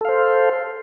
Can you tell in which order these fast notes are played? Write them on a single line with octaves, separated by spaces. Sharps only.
A4 F5 C5